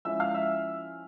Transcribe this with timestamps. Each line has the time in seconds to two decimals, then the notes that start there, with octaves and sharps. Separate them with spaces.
0.05 F3 G#3 C#4 E4 E5 E6
0.20 F5 F6
0.34 E5 E6